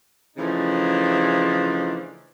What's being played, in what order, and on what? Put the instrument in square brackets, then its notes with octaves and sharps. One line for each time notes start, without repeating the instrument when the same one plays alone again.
[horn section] C#3 E3 F3 A3 D4 D#4